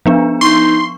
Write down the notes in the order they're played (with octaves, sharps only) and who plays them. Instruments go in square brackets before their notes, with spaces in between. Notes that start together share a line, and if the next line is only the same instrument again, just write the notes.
[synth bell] F3 B3 D4
[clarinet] D#4 [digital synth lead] C6 [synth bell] C#6